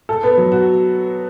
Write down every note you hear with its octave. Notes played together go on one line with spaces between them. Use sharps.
A4
B3
F#3
F#4